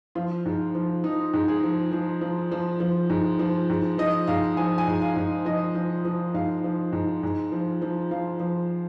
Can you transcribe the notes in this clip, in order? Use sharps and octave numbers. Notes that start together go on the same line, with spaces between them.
F3 F4
G#2
F3
F3 D#4
G#2
G#4
F3
F3
F3
F3
F3
G#2
F3
G#2
F3 D#5
G#2 F5
F3 G#5
G#5
G#2
F5
G#2
F3 D#5
F3
F3
G#2 F5
F3
G#2
G#2
F3
F3
F3 F5
F3